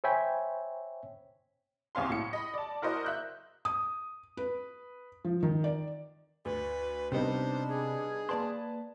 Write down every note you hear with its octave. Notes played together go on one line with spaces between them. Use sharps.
C5 C#5 E5 G5 G#5 B5
C2 C#4 F5 C6
A2 C#7
D#5 B5
D5 A5
E4 F#4 A#4 C5 D5 D#5
E5 F#6 G6
D#6
B4
F3
D#3
D5
D2 B4
C3 G3 B3 D4 D#4 C5
G#4
A#3 B4 D5 A5 C6